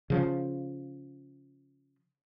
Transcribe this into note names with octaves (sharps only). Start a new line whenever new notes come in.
C#3 F3